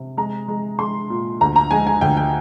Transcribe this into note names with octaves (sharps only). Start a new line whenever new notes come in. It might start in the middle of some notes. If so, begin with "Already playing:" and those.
Already playing: C3
G#3 A#5
G#3
G#3 C6
A#2
D2 A#5
A#5
G#3 G#5
G#5
D2 G5
G5